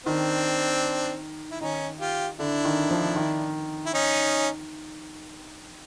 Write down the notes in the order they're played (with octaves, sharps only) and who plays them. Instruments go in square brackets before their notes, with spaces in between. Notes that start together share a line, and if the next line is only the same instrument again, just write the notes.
[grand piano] D#3 [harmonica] C4 D4
[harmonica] E4
[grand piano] D#3 [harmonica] C#4 D#4
[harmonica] F4 G4
[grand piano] D3 [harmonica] D4 E4
[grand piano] D#3
F3
D#3
[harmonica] E4
C#4 D#4